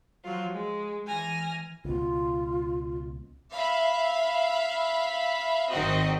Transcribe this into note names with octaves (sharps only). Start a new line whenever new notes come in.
F3 F#3 F4
G#3
E3 G#5 F6 A#6
C#2 B2 F4
E5 F5 B5
G#1 D#3 C4 F#4 D#5